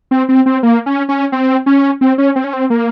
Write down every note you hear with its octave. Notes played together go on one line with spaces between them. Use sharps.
C4
C4
C4
A#3
C#4
C#4
C4
C#4
C4
C#4
C4
C#4
C4
A#3